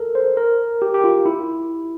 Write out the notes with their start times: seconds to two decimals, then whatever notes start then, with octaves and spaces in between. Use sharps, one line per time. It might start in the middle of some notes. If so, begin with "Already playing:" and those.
Already playing: A4 A#4
0.15 C5
0.37 A#4
0.82 G4
0.94 G4
1.04 F4
1.26 E4